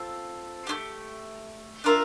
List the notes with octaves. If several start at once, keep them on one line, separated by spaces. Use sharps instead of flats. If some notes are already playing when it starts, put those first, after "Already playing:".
Already playing: C4 F4 A4
A3 D4 G4
D4 F4 A#4 E5